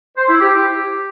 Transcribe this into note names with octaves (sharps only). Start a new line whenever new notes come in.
C5
E4
G4